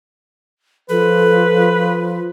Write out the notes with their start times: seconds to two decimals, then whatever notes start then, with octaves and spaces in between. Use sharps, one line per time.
0.89 F3 A4 B4